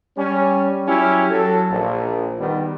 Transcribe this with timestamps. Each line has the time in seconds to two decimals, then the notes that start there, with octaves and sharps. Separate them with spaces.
0.17 G3 C#4
0.87 F#3 C#4 E4 G4
1.30 F#3 A4
1.69 A#1
2.39 D#3 G3 B3